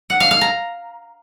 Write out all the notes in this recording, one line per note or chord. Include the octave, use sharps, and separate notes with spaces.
F#5
F5
F5
A#5